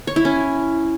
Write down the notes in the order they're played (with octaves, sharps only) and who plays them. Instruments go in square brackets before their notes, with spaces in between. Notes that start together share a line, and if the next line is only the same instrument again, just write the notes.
[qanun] C#5
E4
C#4